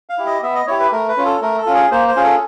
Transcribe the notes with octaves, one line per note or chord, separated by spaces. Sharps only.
F5
E4 G4
D#5
B3 E5
D#5
E4 G4 C#5
B4
A3 A#4
B4
C#4 F4
A4
A3 A#4
A4
C#4 F4
G#4
A#3 C5
C5
C#4 F4 G#4
A4